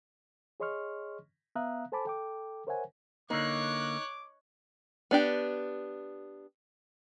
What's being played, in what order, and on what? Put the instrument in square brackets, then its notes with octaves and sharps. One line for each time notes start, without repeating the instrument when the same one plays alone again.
[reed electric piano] G#4 C#5 D#5 C6 C#6 F6
B3 E5 F5 A#5 D#6 F#6
A4 C5 G#5 A5 B5 D6
A4 G5 D6
A#4 C5 C#5 E5 F#5 G#5
[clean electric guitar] D3 A#3 [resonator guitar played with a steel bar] D#4 [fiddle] C#5 F#6 [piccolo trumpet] D6
[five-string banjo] B3 D4 G4